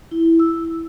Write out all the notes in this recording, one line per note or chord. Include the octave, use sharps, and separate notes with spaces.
E4
E6